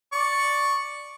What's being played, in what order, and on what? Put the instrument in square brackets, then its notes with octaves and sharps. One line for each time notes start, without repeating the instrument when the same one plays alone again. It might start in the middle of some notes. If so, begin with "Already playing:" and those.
[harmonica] D5 C#6